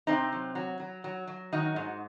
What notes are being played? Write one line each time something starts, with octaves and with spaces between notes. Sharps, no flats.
C3 C4 D#4
F#3
F#3
F#3
F#3
F#3
D#3 D#4 F#4
G#2